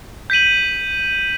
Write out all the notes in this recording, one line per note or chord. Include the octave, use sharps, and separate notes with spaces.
G6 B6 D#7 F#7